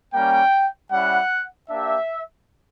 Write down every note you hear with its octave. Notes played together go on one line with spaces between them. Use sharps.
G3 A#3 C#4 G5
G3 C#4 E4 F#5
A#3 D4 G4 E5